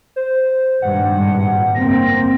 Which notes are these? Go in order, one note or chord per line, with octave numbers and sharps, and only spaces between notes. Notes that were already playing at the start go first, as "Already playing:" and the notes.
C5
G#1 G2 A#2 F#5
F#1 A#3 C4 A#6